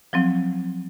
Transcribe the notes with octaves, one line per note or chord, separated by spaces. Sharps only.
F3 F#3 C4